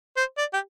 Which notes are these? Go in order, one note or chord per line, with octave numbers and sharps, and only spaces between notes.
C5
D5
G4